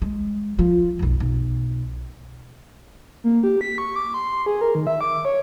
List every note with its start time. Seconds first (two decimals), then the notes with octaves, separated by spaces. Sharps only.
0.02 G#3
0.59 F3
0.99 B1 F2
1.20 B1
3.24 A#3
3.44 G4
3.61 B6
3.78 C#6
3.96 D6
4.14 C6
4.46 G#4
4.61 A#4
4.75 D#3
4.87 E5
5.01 D6
5.25 C#5